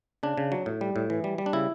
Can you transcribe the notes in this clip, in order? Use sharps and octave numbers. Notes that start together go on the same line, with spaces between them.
C#3 D4
C#3
F#3
A2
G3
A2
E3
G3
G3
D4
C#3 E4